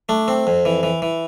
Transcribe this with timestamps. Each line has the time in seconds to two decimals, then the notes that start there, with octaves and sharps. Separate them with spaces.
0.09 A3 D4
0.28 C4
0.47 F2
0.65 E3
0.83 E3
1.02 E3